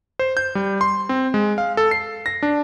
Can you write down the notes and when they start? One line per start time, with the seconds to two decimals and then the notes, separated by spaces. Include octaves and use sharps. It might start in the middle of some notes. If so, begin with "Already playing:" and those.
0.19 C5
0.37 G6
0.55 G3
0.81 C6
1.09 C4
1.34 G#3
1.58 F5
1.77 A4
1.91 C7
2.26 A#6
2.43 D4